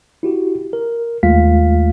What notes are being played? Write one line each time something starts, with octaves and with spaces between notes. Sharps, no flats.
E4 F#4 G4
A#4
D#2 G#3 A3 F4 F5 B6